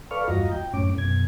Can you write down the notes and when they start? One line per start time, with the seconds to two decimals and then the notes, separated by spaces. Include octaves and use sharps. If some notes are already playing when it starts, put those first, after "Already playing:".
0.11 A4 B4 D5 F5 C#6 F6
0.28 E2 G2 F4 F#4 D#5 A#5
0.52 G5
0.74 F#2 A2 C#4 D6
0.98 F#2 B2 G#6